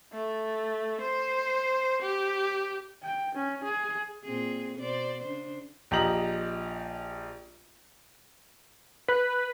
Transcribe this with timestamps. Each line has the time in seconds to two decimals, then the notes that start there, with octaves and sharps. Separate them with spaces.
0.13 A3
1.01 C5
2.02 G4
3.03 G5
3.35 C#4
3.64 G#4
4.24 A#2 C4 G#4
4.78 B2 C5 D5
5.22 C#3 D4 C5
5.91 A#1 G4 D#5 A#5 F#7
9.08 B4 B5 F#6